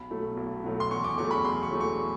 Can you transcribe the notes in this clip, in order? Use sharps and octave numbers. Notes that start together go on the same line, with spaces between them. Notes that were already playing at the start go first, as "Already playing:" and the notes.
Already playing: B1 B5
B2 F#3 A3
B1
B2 F#3 A3
C6
E2 C#6
D6
C#3 F#3 A3 C#6
B5
E2 C6
C#6
C#3 F#3 A3
C#6